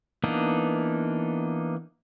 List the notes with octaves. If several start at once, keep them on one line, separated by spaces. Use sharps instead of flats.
E3 A#3 B3 D4 D#4